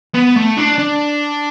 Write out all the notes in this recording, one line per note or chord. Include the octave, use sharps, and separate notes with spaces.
B3
A3
D4
D4